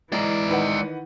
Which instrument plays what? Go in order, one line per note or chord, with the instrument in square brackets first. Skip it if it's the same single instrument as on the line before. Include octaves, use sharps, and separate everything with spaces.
[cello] E3 [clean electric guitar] G#3 A#5 [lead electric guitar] E4 D5
[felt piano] D#3 B4 F#5